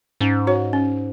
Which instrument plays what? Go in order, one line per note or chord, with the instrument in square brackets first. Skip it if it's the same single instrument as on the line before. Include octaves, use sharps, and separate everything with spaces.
[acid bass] G#2 [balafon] C#4
[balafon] F#4 C#5
C#4